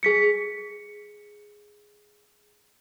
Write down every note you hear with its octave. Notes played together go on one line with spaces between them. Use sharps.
G#4 B6 C#7